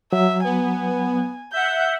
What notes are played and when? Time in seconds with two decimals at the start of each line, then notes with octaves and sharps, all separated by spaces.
0.13 F#3 E5
0.44 B3 G#5
1.53 E5 F#5 G6